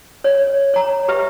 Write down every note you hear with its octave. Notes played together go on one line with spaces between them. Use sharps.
C#5
C#5 A#5
G4 B4 E5